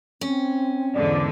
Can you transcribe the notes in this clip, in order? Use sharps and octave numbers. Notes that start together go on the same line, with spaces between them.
C4 C#4
E2 G#2 D3 D5